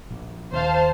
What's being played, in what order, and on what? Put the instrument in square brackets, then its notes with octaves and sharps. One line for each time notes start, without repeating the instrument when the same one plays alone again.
[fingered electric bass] A#1
[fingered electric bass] D#2 [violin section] C5 F5 A5